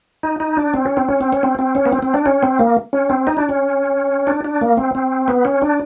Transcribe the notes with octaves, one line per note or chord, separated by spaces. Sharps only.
D#4
D#4
D4
C4
C#4
C4
C#4
C4
C#4
C4
C4
C#4
B3
C4
C4
D4
C#4
C4
A#3
C#4
C4
D#4
D4
C#4
D4
D4
A#3
C4
C4
B3
C#4
D4